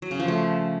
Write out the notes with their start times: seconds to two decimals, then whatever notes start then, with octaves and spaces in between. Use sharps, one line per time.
0.02 F#3
0.11 C#3
0.20 F3
0.28 A3